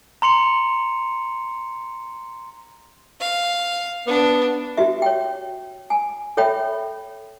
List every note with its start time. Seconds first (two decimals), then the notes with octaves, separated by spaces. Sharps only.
0.22 A#5 C6 C#7 F7
3.21 F5
4.07 B3 D4
4.77 F#4 G4 E5
5.02 C#5 G5
5.90 G#5
6.37 A4 C#5 E5 G5 B5